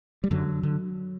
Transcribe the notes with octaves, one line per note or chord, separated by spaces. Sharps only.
G3
F#2 D3 F#3
D3